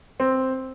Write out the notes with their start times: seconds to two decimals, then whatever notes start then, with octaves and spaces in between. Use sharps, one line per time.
0.20 C4